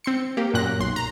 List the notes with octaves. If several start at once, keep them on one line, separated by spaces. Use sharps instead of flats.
C4 C6 C#7
A#3 G4
F#2 A#2 F#3 F#6 A#6
B1 C6
A#5